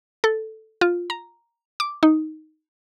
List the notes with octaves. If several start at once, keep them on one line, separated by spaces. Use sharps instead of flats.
A4
F4
A#5
D6
D#4